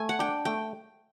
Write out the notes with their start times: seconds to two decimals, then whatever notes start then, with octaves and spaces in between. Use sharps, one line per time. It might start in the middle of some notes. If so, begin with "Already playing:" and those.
Already playing: A3 G#5
0.09 F#5
0.19 D4 G5
0.45 A3 G5